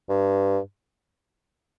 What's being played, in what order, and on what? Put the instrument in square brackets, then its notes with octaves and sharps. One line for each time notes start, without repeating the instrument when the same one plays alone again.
[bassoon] G2